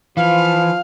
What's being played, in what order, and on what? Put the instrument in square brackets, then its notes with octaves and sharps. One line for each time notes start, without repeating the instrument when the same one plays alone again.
[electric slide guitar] E3 [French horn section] F3 [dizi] F5